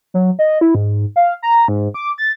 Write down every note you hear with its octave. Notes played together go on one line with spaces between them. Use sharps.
F#3
D#5
E4
G#2
F5
A#5
G#2
D6
A6